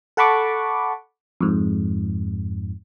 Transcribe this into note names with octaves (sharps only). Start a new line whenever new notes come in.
A4 F#5 A5 B5 C#6 D6
F2 G#2